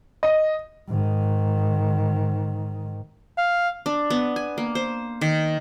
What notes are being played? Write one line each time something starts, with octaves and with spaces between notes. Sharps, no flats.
D#5
G#2 D#3
F5
D4
B3
G#5
A#3
C5
D#3